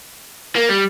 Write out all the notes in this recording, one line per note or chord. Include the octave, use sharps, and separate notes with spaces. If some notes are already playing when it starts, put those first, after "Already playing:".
A#3
G3